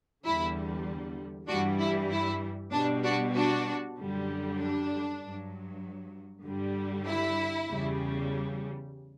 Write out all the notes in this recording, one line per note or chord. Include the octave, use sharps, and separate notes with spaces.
E2 D3 G3 E4
G2 E3 G3 D4 F#4
E4
E4
B2 G3 D4
D4 F#4
D4 F#4
F#2 D3 G3
D4
G2 F#3
G2 D3 G3
E4
E2 C#3 G3